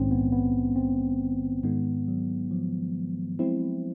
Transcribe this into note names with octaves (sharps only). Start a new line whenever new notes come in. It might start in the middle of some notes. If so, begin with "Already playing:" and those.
Already playing: A#1 G#2 D#3 G#3 C4 C#4
B3
B3
C4
G#2 D#3 G#3 B3
F#3
F3
G#3 C4 E4